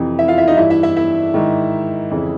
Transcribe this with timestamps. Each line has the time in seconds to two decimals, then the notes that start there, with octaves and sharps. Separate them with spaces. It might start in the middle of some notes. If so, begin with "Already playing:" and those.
Already playing: F2 C3 E3
0.19 E4 E5
0.28 F4 F5
0.38 E4 E5
0.48 D#4 D#5
0.57 G2 E3 E4 E5
0.70 E4 E5
0.83 E4 E5
0.97 E4 E5
1.34 G#2 D#3
2.11 F2 C#3 E3